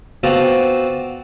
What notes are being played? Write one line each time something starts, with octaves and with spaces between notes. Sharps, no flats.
B3 C4 D4 F4 F#4 D5